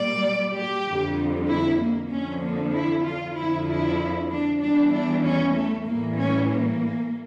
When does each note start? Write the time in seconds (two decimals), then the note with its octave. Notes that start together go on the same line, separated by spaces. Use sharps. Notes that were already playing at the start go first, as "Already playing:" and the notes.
Already playing: A#2 G3 D5
0.55 G4
0.86 F2 D3 G3
1.48 E4
1.80 A#3
2.10 F2 D3 F3 C#4
2.42 A#3
2.73 E4
3.04 F4
3.35 F2 D3 F3 E4
3.67 E4
4.30 D4
4.61 E2 E3 G3 D4
4.92 D4
5.23 C#4
5.55 A3
5.85 A2 E3 G3 A#3
6.17 C#4
6.48 A#3